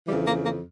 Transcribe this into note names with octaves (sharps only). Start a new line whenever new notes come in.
F2 C#3 E3 G3
A#3
A#3